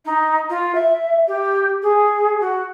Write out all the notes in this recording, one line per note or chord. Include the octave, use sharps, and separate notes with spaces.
D#4
F4
E5
G4
G#4
F#4